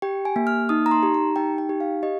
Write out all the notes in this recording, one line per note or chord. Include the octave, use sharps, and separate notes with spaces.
G4 G5
G#5
A#3
F6
D#4 D#6
A#5
C6
G4
A#5
D#4 G5
G5
G4
F5
G4 D#5